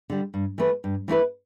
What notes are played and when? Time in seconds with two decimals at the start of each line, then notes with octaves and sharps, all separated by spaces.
0.10 D3 G3
0.34 G2
0.58 E3 A3 E4 B4
0.84 G2
1.08 E3 A3 E4 B4